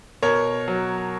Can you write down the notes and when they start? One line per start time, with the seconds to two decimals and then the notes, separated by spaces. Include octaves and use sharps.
0.23 B2 A#4 C#5
0.68 F#3